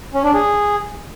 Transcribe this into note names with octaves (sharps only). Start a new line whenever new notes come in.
C#4
D4
G#4